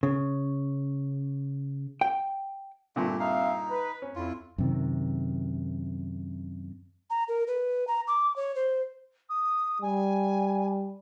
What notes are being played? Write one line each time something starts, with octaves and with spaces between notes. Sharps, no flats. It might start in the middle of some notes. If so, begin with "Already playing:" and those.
C#3
G5
G2 A#2 D3 A3
C4 D#4 E5 F5
B4
C#4
F2 E4 F4
F#2 C3 D#3
A#5
A#4
B4
A#5
D6
C#5
C5
D#6
G3 G#5